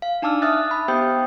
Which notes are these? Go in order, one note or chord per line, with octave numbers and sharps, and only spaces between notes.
F5
D4 D#4 A5 D6 E6 F6
E5 D#6 F6 F#6 A6
B5
B3 G4 C5 G5 D#6 G6